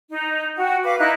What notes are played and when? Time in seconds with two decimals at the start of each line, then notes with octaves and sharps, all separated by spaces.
0.11 D#4
0.56 F#4 G5
0.84 B4 F5 D6
0.99 D#4 E4 F#6